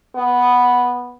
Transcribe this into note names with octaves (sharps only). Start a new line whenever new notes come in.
B3